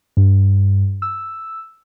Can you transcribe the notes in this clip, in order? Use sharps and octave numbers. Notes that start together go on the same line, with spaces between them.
G2
E6